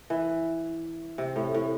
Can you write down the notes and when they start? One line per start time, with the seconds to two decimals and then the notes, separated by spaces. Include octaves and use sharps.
0.10 E3
1.18 C3
1.36 A2
1.54 A2